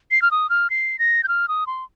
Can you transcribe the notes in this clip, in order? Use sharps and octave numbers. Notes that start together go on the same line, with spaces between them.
C7
F6
D#6
F6
C7
A#6
G6
F6
D#6
C6